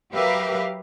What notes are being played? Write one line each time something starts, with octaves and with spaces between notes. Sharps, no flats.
F#3 G4 A#4 B4 E5 F5